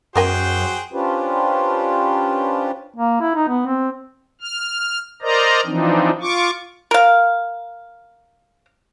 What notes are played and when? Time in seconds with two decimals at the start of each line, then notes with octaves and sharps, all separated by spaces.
0.16 F#2 B3 F#4 G#4 A#4 C5 G5 G#5
0.92 C#4 D4 F4 G4 B4 C5
2.97 A#3
3.21 E4
3.35 D#4
3.48 B3
3.66 C4
4.41 F6
5.22 A#4 C5 D5 D#5 A#5
5.66 E3 F3 C4 D4 D#4
6.21 F4 C#6 D6
6.91 A#4 F5